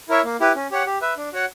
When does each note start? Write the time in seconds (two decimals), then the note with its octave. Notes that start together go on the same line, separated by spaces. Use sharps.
0.09 E4 A#4 C#5 E5
0.24 A#3
0.40 E4 G4 B4
0.55 C#4
0.71 G4 C#5 F#5
0.86 G4
1.02 B4 E5
1.17 D4
1.33 F#4 C#5 F#5